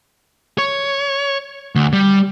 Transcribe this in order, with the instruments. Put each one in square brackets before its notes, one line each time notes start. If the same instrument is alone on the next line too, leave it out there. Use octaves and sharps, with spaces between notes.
[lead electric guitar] C#5
D2
G3